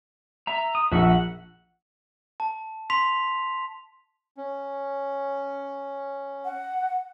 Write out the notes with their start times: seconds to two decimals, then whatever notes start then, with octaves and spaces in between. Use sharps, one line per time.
0.47 E5 A#5
0.75 D#6
0.92 A#1 F#4 E5 F#5
2.40 A5
2.90 C6 B6 F7
4.37 C#4
6.45 F#5